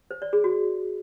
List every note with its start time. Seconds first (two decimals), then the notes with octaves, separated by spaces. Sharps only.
0.11 C5
0.22 D5
0.33 G#4
0.44 F#4